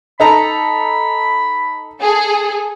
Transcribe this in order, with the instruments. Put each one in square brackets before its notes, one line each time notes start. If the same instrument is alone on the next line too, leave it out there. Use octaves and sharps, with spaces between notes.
[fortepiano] D#4 A4 A#5 [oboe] B5
[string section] G#4 A4